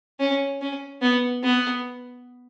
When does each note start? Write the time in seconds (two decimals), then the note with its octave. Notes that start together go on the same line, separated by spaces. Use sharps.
0.20 C#4
0.61 C#4
1.02 B3
1.43 B3